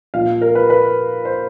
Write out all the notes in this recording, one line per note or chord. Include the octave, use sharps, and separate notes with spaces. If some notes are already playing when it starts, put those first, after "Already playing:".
A#2 F3 F5
A#4
B4
B4
C5